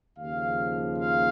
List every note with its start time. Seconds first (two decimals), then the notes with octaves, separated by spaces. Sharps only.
0.18 D#2 C#3 F3 F5
0.98 F5